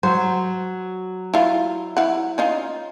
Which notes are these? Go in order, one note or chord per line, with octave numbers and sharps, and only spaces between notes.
F#3 C5
E4 F4
E4 F#5
C#4 D#4 F4